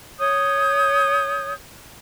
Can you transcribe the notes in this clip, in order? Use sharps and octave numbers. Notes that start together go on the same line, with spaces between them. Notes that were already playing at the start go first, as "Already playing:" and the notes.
C#5 D#6 G6